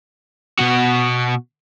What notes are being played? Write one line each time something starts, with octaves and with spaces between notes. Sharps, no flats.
B2 F#4